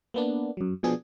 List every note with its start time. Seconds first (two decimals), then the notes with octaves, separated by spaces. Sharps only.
0.14 A#3 B3 D4
0.57 F#2 F#3
0.83 B2 F3 B3 D4 G#4